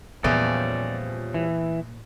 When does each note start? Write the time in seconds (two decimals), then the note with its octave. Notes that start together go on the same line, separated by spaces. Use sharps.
0.24 E2 A#2 F3 G3 C#4 D5
1.34 E3